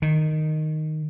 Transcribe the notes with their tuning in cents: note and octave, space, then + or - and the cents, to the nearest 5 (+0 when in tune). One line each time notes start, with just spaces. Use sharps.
D#3 -5